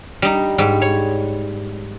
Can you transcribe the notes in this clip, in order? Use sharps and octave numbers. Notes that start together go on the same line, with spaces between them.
G3 D#4
G#2 G3
C#5